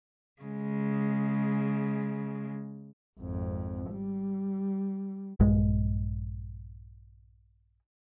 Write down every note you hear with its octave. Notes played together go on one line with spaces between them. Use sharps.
C#3 G#3
G#1 F2
G3
A#1 G2 G#3